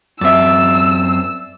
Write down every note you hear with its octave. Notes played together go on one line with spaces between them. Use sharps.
F#2 C4 D5 E5 E6